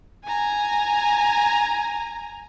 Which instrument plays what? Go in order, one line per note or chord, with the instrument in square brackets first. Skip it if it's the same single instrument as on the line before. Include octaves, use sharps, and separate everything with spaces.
[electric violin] G#5 A#5